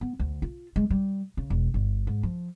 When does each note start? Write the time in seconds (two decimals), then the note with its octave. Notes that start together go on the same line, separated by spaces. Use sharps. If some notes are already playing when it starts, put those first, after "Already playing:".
0.01 B3
0.19 D2
0.42 F4
0.76 G#3
0.90 G3
1.37 C#3
1.50 E1
1.74 G1
2.07 G#2
2.23 F3